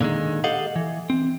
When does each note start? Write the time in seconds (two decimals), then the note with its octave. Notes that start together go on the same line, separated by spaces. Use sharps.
0.01 A#2 D3 D#3 G#3
0.44 G4 A4 D#5 F5 F#5
0.76 E3
1.10 C4